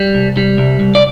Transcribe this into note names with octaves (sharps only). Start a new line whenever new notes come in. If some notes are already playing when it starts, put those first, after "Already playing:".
Already playing: G3
C2
G3
C2
C2
D5